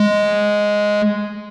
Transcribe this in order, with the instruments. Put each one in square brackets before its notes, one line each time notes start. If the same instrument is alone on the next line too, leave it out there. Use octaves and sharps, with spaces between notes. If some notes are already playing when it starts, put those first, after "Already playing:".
Already playing: [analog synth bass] G#3